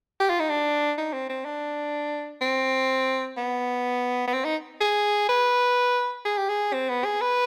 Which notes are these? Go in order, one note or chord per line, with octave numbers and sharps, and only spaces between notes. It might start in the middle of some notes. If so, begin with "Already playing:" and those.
G4
F4
D#4
D4
D#4
C4
C4
D4
C4
B3
B3
C4
D#4
G#4
B4
G#4
G4
G#4
C4
B3
G#4
B4